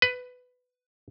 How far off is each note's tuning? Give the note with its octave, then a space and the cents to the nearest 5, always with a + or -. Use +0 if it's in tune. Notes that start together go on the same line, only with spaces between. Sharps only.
B4 +15